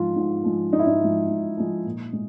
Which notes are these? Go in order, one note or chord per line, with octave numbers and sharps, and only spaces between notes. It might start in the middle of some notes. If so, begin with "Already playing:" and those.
Already playing: G#2 F3 G#3 F4
G#2
F3 G#3
G#2 D#4
E4
D#4
F3 G#3
G#2
F3 G#3
A#2
G#3